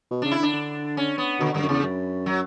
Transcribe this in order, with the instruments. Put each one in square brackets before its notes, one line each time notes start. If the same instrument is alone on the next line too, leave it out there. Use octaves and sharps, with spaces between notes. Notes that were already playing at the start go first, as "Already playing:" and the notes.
[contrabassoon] B2
[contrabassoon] C#3 [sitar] D4
[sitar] E4
[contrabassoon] D3 [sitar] D4
[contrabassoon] D3
[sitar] C#4
B3
[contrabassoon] B2 [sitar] D3
[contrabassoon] G2 [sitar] D3
[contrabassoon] F#2
[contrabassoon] E2 [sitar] C#3
[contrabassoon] F#2
[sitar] F#3